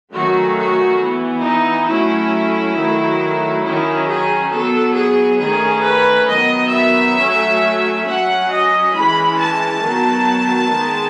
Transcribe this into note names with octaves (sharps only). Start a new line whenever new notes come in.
D#3 F#3 A3 C#4 F#4
F#4
E3 B3
D#4
F#3 A3 C#4 E4
D#3 F#3 A3
D#3 F#3 C#4 E4
G#4
F#3 B3 A4
G#4
D#3 A3 C#4 G#4
B4
D#3 F#3 B3 D#5
E5
F#3 A3 C#4
F#3 C#4 F#5
D#5
E3 G#3 C#4 B5
A5
D#3 F#3 B3
D#3 G#3 B3